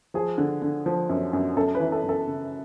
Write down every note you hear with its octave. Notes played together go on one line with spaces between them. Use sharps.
F3 G#4
D3
D3
F3
F#2
F#2
F#2 A4
B4
E3
A4
F#2
A4
C#3